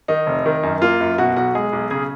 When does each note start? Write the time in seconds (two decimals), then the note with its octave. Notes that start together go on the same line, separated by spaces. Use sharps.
0.08 D#3 D#4
0.27 F1
0.46 D#3
0.63 F#2
0.81 A#3 F4
1.00 F#2
1.18 B2 F#4
1.36 B1 F#4
1.55 G#3 G#4
1.73 B1
1.91 C#3 G#4